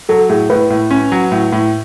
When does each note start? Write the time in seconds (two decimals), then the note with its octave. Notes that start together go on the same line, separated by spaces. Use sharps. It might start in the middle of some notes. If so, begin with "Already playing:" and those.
0.09 F#3 A4
0.29 A2 G#4
0.50 A2 B4
0.70 A2
0.90 C#4
1.12 F#3
1.32 A2
1.52 A2